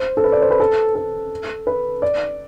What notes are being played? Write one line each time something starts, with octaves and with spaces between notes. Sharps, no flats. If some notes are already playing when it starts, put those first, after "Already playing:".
Already playing: C5
A4
B4
D5
C5
B4
A4
A4
B4
D5